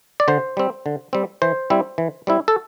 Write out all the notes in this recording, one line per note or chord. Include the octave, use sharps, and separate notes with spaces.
D5
D3 C5
G3 C4
D3
G3 C4
E3 C5
G3 C4 E4
E3
G3 C4 E4
A4